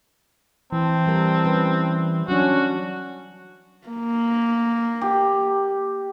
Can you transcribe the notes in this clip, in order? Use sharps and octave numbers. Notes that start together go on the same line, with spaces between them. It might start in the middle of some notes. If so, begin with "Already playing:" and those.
E3 C4 A5
G3 A#4
G3 C#4 B4
F#3 C#4 D4 F#4
A#3
G4